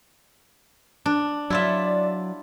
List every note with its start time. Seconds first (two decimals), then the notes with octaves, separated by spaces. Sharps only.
1.06 D4
1.50 F#3 E4 F4 D5 E5